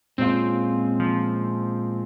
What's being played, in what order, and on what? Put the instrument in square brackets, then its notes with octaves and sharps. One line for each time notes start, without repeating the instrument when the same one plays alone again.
[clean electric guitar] A#2 G#3 C#4 F4 [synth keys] C4
[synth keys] F3